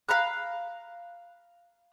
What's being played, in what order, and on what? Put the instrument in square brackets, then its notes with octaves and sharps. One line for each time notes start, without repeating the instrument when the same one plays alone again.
[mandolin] F5 A#5 B5 F#6